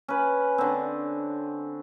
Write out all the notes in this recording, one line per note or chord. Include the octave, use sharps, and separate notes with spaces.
C#4 B4
D3 C4